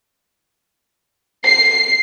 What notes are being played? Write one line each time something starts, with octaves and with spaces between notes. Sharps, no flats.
C7